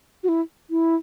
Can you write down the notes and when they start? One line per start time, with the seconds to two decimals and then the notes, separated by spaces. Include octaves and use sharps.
0.23 F#4
0.29 E4
0.70 E4